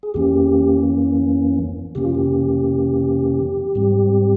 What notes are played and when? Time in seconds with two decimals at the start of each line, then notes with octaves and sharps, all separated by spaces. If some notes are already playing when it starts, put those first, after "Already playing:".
0.03 G#4
0.14 F2 E3 A#3 C#4 G4
1.95 F2 C3 E3 A#3 C#4 G4
2.05 F4
2.15 G4
3.75 G#2 G3 C4